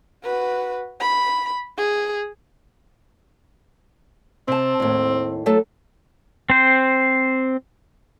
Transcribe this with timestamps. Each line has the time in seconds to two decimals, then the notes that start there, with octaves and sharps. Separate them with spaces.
0.24 F#4 B4
1.00 B5
1.78 G#4
4.48 C3 C4 A5
4.80 D#2 A2
5.46 F#3 A3 A4
6.50 C4 C5